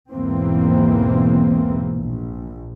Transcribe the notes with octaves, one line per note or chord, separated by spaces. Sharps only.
B1 E2 G#2 E3 A#3 C4
A#1